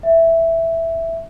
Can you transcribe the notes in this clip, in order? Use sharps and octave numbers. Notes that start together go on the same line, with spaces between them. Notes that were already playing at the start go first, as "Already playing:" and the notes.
E5